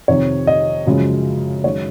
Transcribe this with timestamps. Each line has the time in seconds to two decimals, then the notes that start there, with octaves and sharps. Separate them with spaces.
0.08 F2 C3 D#3 C#5
0.47 D#5
0.86 F#2 C#3 F3 G#3
1.64 F#2 D#3 G#3 C#5